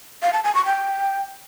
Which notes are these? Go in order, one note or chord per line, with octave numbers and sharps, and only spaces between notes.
F5
A5
G#5
C#6
G5